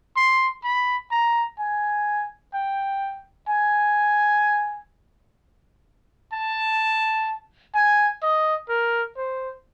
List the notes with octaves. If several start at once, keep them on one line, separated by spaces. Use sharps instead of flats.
C6
B5
A#5
G#5
G5
G#5
A5
G#5
D#5
A#4
C5